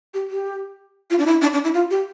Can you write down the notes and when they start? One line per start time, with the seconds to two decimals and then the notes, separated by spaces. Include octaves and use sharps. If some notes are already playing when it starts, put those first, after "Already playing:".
0.14 G4
0.30 G4
1.10 F4
1.19 D4
1.26 E4
1.42 D4
1.53 D4
1.64 E4
1.74 F4
1.91 G4